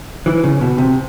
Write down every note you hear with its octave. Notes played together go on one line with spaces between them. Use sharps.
E3
C#3
B2
C3